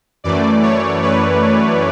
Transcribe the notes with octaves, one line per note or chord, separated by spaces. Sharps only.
F#2 E3 A3 D5
C#5
B4